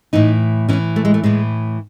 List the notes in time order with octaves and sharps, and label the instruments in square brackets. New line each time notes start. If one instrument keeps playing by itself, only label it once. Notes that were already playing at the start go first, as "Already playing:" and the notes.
[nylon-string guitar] A2 E3 D#4
A2 E3 C#4
A3
G#3
A3
A2 E3 G#3